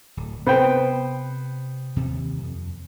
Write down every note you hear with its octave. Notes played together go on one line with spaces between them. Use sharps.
D1
C3 B3 C4 C5 G5
D#2 C3
F2